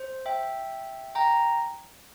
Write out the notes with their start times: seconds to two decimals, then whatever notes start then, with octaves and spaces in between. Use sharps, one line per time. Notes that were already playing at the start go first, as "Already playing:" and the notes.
Already playing: C5
0.26 E5 G5
1.15 G5 A#5